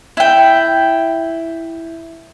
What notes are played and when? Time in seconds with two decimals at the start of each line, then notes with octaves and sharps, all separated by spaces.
0.17 E4 G5